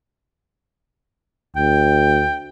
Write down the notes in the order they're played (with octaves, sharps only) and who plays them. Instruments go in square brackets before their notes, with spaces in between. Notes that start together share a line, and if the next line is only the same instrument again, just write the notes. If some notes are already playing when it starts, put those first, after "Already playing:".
[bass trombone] D2 [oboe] G5